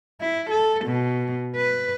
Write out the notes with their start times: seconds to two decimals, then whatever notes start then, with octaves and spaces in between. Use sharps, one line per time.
0.21 E4
0.50 A4
0.85 B2
1.56 B4